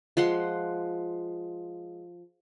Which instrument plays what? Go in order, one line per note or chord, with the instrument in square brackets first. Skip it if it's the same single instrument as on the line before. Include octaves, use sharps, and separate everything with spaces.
[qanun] F3 G#3 F#5 C6